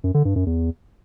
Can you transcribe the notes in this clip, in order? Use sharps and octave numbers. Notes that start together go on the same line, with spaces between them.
F#2
D3
G2
F#2
E2